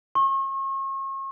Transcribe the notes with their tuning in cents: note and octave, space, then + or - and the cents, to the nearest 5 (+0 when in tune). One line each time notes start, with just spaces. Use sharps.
C#6 -40